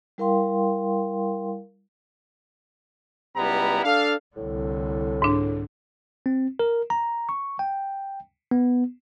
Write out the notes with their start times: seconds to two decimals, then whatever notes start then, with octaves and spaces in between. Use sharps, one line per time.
0.18 G3 E4 A#4 F5 G5 C6
3.36 C#2 G3 B3 E4 A#5
3.84 D4 A4 F5
4.36 C2 A2 D3
5.22 G#2 D4
6.26 C4
6.59 A#4
6.90 A#5
7.29 C#6
7.59 G5
8.51 B3